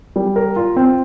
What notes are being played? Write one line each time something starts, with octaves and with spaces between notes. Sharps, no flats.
G3
A#4
F4
C4